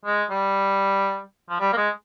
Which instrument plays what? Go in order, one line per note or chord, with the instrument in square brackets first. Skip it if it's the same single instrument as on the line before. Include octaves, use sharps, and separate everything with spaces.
[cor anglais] G#3
G3
F3
G3
A#3
G#3